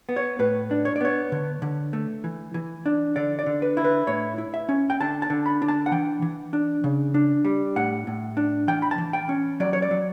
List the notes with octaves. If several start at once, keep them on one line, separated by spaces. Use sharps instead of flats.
B3
C#5
A2 B4
D4
C#5
D5
B3 C#5
D3
D3
A3
E3
E3
D4
D3 D5
D5
D3
B4
E4
B4
A2 C#5
E4
E5
C#4
G5
D3 A5
A5
D3
B5
D4
A5
F#5
E3 G5
E3
D4
C#3
D4
G3
A2 F#5
A2
D4
E3 G5
B5
A5
E3
G5
C#4
F#3 D5
C#5
D5
F#3